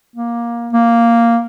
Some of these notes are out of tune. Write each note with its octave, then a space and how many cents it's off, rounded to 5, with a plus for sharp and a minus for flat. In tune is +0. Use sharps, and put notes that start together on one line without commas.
A#3 +15
A#3 -5